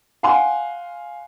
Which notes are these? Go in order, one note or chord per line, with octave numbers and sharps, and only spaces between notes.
F5 F#5 G#5 C6